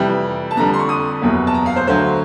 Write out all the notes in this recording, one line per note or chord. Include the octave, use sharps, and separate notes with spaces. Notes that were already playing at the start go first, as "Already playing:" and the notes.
Already playing: F2 C3 E3 G3 G5
A5
F2 D3 G3 A#5
C6
C#6
D#6
F#1 E2 B2 F#3
A5
A#5
F5
C5
D2 D3 F#3 C5